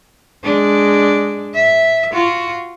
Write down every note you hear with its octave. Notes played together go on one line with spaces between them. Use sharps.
G#3 D4
E5
F4 F#4